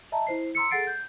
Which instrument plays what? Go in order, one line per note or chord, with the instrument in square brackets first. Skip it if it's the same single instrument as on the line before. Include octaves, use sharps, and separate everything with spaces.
[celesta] D#5 E5 A5 A#5
E4 C5 C7
A#5 C6 E6 C#7
G#4 A4 F#5 A6 C7 D7
G6